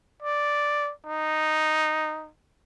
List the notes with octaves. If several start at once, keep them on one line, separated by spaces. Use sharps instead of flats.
D5
D#4